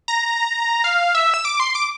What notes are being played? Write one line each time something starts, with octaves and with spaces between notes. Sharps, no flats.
A#5
F5
E5
E6
D6
C6
D6